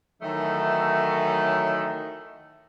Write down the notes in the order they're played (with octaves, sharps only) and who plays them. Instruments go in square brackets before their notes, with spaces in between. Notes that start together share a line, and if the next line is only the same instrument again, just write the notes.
[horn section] D#3 E3 F#3 A3 D#4 A4